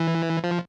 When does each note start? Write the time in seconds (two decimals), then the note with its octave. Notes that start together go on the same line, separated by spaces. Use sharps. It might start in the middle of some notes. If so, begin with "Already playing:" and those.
Already playing: E3
0.44 F3